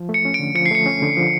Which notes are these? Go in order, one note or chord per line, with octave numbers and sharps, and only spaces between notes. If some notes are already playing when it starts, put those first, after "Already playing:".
Already playing: F3
A3
C#7
C#4
D7
D3
F3 C#7
C7
A3 C#7
C#4
D3
F3